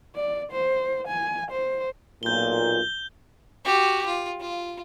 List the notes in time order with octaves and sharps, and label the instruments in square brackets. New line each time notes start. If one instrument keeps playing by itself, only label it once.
[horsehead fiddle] D5
C5
G#5
C5
[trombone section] B1 A#2 [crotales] G6 G7
[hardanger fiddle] F#4 G4
F4
F4